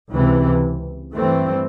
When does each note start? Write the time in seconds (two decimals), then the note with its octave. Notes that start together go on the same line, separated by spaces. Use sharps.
0.10 C#2 C3 E3
1.13 G2 E3 A3 C4